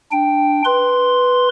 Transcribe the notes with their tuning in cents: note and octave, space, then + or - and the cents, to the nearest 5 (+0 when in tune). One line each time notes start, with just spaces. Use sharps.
D4 +0 G5 +0
B4 +0 C6 +0